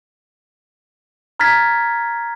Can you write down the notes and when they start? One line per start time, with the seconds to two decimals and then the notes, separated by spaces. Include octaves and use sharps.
1.40 A#5 F6 G#6 A6 B6